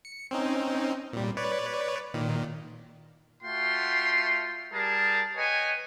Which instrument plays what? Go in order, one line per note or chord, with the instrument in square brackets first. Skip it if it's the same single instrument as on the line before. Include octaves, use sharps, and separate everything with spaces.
[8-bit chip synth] C#7
C4 C#4 D#4
A#2 G3
B4 C#5 D5
A#2 D#3
[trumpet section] A3 F4 F#4 G5 C6
G3 G#4 A#4 A5
B4 C#5 D#5 G5 G#5